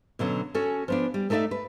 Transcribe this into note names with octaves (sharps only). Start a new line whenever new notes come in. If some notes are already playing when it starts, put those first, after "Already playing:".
B2 D3 F#3 C#4
C#4 F#4 A4 G#5
F3 B3 D4
G3
A3 D#4 A4 C#5 D5 E5
B4